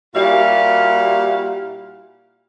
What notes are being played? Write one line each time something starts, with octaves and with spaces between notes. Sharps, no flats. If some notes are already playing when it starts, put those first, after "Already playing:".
A#2 G3 E4 F#4 F5